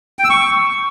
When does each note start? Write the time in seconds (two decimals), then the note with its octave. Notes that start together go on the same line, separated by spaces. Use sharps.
0.19 G5
0.24 E6
0.30 C#6